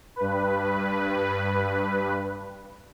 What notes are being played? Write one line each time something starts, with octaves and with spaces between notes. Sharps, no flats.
G2 B4